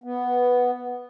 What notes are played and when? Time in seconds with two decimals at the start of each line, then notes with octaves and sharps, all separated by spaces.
0.04 B3